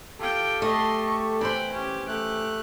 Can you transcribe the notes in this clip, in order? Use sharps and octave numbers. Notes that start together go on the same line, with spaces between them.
F4 G4 A4 G5
A3 D#5 C6
C#6
E3 C5 G5 B5
C#4 G4
A3 G4 F#6